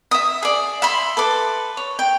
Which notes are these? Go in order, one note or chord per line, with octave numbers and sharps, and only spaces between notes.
E5 D#6
G#4 D5
E5 B5 C6
A4 B4 D6
C#5
G5